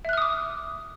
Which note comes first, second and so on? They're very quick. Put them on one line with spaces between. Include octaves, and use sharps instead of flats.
E5 F#6 F6 D#6 D6